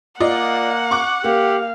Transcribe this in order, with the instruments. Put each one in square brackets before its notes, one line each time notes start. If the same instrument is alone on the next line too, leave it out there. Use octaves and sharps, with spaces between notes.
[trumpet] A#3 [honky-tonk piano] F4 D5 D#5 [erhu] F#5
[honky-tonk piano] C#6 D6 F#6
[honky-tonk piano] A#3 [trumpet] G4 [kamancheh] F5